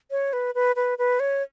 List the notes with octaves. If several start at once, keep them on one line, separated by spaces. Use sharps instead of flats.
C#5
B4
B4
B4
B4
C#5